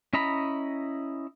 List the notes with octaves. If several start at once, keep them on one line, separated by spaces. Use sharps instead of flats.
C#4 E4 D#5 A#5 B5